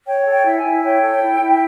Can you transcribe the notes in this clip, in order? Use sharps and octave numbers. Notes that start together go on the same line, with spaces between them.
C#5 G5
A4
G5
E4
G#5
E4
C#5 G5
A4
E4
E4